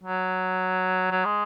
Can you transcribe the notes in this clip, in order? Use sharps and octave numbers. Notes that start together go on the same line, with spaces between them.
F#3
F#3
G#3